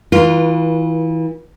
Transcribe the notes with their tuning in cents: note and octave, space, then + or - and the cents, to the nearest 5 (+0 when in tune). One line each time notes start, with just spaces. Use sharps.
E3 -25 F4 +0 B4 -35